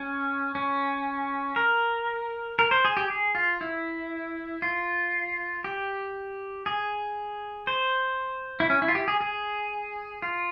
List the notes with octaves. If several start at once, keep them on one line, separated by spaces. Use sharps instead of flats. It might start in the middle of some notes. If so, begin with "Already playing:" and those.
Already playing: C#4
C#4
A#4
A#4
C5
G#4
G4
G#4
F4
E4
F4
G4
G#4
C5
E4
C#4
E4
F4
G4
G#4
G#4
F4